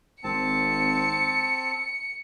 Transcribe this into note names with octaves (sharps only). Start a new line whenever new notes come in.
G#1 C4 A5 C#7